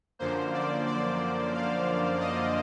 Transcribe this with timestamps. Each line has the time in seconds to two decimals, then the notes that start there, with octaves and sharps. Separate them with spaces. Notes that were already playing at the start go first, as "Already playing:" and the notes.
0.19 F#2 D3 F3 A#3 C5
0.54 D5
0.87 D5
1.54 F5
2.20 D#5